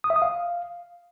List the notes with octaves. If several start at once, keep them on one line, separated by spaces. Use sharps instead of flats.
D#6
E5
D#6
F5